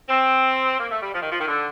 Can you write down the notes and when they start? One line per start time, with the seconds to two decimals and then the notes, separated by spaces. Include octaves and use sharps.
0.09 C4
0.78 A#3
0.90 A3
1.02 G3
1.14 F3
1.21 D#3
1.30 F3
1.39 D#3
1.48 D3